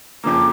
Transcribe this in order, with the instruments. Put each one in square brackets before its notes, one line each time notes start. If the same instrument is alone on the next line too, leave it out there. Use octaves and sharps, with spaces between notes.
[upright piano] F2 C#3 F3 A#3 [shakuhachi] D6